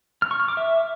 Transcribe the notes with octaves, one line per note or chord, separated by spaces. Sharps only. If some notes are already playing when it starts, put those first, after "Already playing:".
F6
C#6
F6
D6
E5